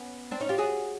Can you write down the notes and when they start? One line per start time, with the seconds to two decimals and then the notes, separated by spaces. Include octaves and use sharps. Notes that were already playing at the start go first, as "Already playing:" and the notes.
Already playing: B3 C#4
0.31 C4 D4
0.40 C#4 D#4
0.49 F4 G4
0.58 F#4 G#4